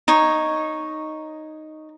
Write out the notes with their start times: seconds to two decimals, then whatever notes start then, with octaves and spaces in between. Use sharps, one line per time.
0.08 D#4 C#5